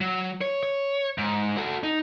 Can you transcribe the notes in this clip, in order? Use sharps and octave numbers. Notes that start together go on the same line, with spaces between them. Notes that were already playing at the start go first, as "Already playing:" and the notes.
F#3
C#5
C#5
G#2
F#4 A4
D#4